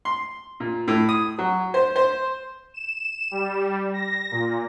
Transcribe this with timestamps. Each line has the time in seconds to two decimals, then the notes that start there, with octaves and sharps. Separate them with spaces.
0.05 C6
0.60 A#2
0.88 A2
1.09 D#6
1.38 F#3
1.74 C5
1.96 C5
2.74 E7
3.31 G3
3.93 A#6
4.31 A#2